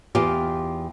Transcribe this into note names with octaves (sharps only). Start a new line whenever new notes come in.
E2 F4 G4